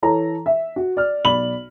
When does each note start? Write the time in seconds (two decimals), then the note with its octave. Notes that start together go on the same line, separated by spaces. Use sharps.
0.02 E3 A4 C#5 A#5
0.46 E5
0.76 F#4
0.97 D5 F6
1.25 B1 D5 B5 F#7